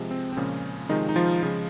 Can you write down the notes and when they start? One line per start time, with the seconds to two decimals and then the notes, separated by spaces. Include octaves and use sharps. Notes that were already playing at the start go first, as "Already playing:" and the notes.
Already playing: C3 F3 G#3
0.11 C4
0.33 C4
0.37 A#2 C#3 F3 G#3 C#4
0.89 C3 D#3 F3 G#3 D#4
1.09 D#4
1.16 F3 F4
1.43 C#3 F3 G#3